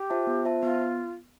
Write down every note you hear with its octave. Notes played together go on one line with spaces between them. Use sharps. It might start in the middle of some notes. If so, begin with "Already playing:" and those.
Already playing: G4
F4 C5 E5 A5
B3
F4 C5 E5 A5
B3 F4